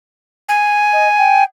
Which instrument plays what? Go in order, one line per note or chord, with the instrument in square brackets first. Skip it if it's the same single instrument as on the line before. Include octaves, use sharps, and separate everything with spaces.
[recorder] G#5
[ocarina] D#5
G5